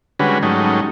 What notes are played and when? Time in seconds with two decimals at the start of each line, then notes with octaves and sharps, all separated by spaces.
0.19 D3 G3 G#3 C#4 F#4 B4
0.43 G#2 F#3 G3 A3 C#4 D#4